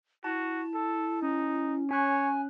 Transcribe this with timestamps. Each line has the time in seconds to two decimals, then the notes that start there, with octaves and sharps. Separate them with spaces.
0.24 E4 F#4 A5
0.74 A4
1.22 C#4 D#4
1.91 C#4 C#5 G#5 F#6